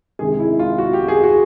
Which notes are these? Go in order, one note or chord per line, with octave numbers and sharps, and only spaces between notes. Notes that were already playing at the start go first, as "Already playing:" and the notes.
C3 D#3 G#3 G#4
E4
F4
F#4
G4
G#4
F#4